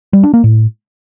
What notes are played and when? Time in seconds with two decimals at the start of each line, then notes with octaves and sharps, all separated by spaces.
0.13 G3
0.23 D4
0.34 A#3
0.44 A2